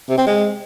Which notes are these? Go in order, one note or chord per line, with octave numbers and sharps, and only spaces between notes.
C3
C4
G#3